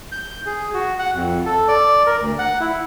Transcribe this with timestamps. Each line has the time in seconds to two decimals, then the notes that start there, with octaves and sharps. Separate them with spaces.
0.12 G6
0.46 G#4
0.74 F#4
0.99 F#5
1.15 F2
1.46 A4
1.68 D5
2.06 A#4
2.21 D2
2.39 F#5
2.60 E4